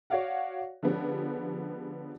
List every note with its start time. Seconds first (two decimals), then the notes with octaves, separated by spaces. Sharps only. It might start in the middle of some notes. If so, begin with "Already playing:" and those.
0.10 F#4 C#5 D5 F5 F#5
0.83 D3 F3 G#3 B3 C#4 G4